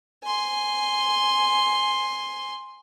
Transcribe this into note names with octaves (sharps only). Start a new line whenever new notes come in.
G#5 C6